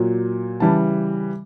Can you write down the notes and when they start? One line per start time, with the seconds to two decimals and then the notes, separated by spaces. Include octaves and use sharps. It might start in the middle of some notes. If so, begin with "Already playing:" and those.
Already playing: A#2 F#3
0.60 C#3 E3 G3 A5